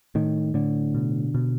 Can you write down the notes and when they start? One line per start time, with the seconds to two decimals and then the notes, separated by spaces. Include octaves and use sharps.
0.15 A2 D#3
0.54 A2 D3
0.95 B2
1.35 B2